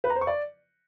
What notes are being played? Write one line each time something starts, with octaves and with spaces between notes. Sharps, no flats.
B4
A#5
C5
C#6
D5